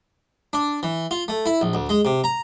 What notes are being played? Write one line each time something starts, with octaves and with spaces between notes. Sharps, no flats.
D4
E3
F4
A3
E4
A#1
D2
G#3
C3
A#5